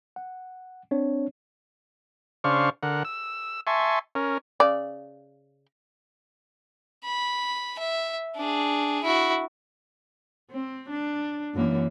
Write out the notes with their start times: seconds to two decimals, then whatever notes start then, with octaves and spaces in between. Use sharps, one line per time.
0.16 F#5
0.91 C4 D4 C#5
2.44 C#3 D4 C5 F5 C#6
2.83 D3 A#4 F#5
3.05 E6
3.67 E5 G#5 A5 C6 C#6
4.15 C#4 A#4
4.60 C#3 D5
7.05 B5
7.79 E5
8.36 D4 G#4
9.04 E4 F#4
10.51 C4
10.90 D4
11.54 F#2 E3 A#3